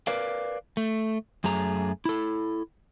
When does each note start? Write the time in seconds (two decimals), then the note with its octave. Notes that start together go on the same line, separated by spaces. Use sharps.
0.07 A#4 B4 D5 F5
0.77 A3
1.44 F#2 A3 G#4 A#5
2.05 E4 A4